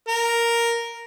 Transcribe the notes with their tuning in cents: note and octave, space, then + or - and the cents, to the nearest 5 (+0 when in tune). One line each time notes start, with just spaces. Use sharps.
A#4 +0